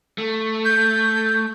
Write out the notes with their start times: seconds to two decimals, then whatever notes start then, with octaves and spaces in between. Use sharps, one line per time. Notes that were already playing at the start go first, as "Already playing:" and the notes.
0.18 A3
0.65 G6